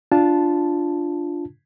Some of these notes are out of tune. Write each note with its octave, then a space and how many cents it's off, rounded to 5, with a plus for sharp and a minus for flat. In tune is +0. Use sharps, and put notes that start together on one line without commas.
D4 +0 F4 -5 A5 -5